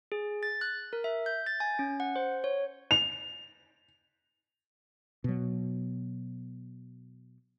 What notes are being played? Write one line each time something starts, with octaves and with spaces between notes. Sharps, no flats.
G#4
A6
F#6
A#4
E5
G6
A6
G#5
C#4
F#5
C5
C#5
F7
B2 F#3